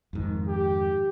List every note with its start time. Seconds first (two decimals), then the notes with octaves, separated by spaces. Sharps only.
0.13 F2 G#2 D#3
0.48 G4